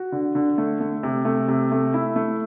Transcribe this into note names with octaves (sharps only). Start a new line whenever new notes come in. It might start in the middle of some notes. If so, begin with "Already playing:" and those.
Already playing: F#4
D3
D3
A3
A3
C3
A3
C3
A3
E4
A3